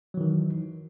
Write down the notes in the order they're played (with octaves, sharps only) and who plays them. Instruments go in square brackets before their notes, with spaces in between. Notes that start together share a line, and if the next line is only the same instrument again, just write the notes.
[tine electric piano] F#3
E3
D#3